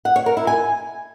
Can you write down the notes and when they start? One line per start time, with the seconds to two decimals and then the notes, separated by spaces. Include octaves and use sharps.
0.05 F#5
0.16 C#5
0.26 A#4
0.37 E4
0.47 G#5